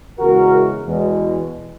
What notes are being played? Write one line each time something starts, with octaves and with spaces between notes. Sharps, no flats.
E2 C#3 E3 G#3 F#4 A#4
E2 B2 G#3